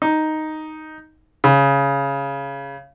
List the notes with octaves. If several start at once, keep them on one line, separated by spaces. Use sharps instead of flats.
D#4
C#3